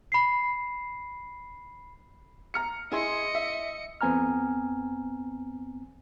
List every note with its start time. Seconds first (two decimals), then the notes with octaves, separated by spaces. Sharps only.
0.12 B5 C7
2.54 A#5 F6 C#7
2.92 E4 G#4 D#5 C6 C#7
3.35 E5
4.01 F2 B3 C4 G#5 A#5 F6